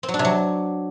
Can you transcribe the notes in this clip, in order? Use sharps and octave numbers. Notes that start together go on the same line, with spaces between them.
C4
F#3
D4
C3
F#3